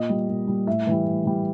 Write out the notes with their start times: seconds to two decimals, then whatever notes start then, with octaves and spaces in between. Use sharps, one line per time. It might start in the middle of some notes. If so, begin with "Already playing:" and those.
Already playing: A#2 D#5
0.09 G3
0.28 A#2
0.48 G3
0.67 A2 E5
0.87 E3 G3
1.05 A2
1.25 E3 G3